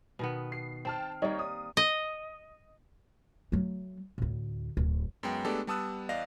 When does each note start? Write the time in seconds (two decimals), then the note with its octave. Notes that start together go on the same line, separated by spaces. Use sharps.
0.19 B2 D#3 B3
0.52 C7
0.85 C4 G5 A5 F6
1.22 G3 A#3 D#4 C#5 D#5
1.39 D#6
1.77 D#5
3.52 F#3 A3
4.18 D2 A2
4.77 D1
5.23 F#2 G#3 B3 G5
5.45 G#3 A3 B3 D4 G4 A4
5.67 G3 B3 A5 D#6 E6 F#6
6.09 E2 D5 D#5 F5 A#6